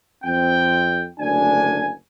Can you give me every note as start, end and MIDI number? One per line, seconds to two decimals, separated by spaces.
0.24 1.06 41
0.24 1.06 60
0.24 1.06 79
1.20 1.92 30
1.20 1.92 38
1.20 1.92 62
1.20 1.92 80